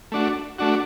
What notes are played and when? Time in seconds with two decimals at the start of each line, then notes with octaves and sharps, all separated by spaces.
0.12 A3 D4 F#4
0.59 A3 D4 F#4